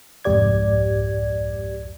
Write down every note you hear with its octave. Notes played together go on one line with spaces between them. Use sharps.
C2 F2 G#2 G4 D5 G#6